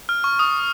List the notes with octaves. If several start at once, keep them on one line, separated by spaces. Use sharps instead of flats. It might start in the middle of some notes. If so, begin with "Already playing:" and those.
F6
C#6
D#6